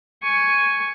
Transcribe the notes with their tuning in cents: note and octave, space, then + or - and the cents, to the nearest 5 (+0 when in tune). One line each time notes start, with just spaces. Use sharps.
G#5 +0 C#6 +0